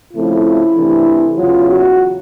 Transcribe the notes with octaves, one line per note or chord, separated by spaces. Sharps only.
C#3 F3 A3 C4 E4
C3 E3 A3 D4
E2 C#3 F#3 F4
F#4